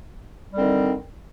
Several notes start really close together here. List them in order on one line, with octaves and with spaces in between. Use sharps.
G3 D3 C4 D#3